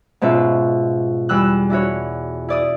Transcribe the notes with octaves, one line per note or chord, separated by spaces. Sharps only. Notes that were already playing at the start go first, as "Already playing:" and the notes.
G#2 B2 C#4 F4 E5
E2 G3 E6 F#6
D4 E4 F#4 C#5
E4 D5 D#6